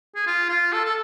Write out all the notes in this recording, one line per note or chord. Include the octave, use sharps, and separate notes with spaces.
G#4
F4
F4
A4
A4